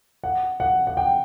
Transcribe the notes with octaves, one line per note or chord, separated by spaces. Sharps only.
F#5
F#5
F#5
G5